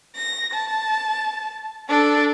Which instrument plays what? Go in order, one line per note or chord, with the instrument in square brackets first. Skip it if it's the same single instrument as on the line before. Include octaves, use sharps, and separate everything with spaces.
[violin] A#6
A5
D4 A4